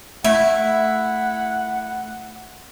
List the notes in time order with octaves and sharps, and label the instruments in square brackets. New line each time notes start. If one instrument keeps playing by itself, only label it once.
[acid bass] A3 [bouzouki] E4 [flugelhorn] F#5